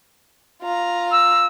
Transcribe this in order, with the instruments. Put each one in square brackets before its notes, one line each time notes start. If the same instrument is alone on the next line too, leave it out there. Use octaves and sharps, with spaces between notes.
[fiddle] F4 A#5
[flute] E6